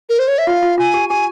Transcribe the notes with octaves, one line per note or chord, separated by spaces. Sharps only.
A#4
C5
C#5
E5
F4 F5
F4
F4 G#5
G4
G4 G#5